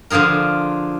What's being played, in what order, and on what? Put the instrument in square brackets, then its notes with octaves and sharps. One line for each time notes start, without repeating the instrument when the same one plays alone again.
[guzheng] D3 F3 F4 G#4 A#4